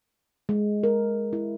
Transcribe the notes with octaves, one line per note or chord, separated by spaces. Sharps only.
G#3
A#4
E4